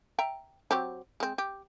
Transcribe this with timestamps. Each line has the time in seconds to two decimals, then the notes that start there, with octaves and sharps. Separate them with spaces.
0.19 E5 G5 A#5
0.71 F#3 C4 G4
1.20 G#3 C4
1.38 G4